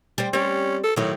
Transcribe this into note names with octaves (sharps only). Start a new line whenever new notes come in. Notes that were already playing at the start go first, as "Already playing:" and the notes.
G3 C4
G3 C4 C#4
A4
A2 D#3 F#3